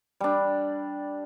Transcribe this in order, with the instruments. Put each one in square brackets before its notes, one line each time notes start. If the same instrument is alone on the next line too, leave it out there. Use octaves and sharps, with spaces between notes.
[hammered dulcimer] G3 D4